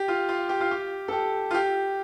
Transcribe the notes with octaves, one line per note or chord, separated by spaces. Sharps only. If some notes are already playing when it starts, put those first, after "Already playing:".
Already playing: G4
F4
F4
G4
F4
G4
A4
G4
F4
G4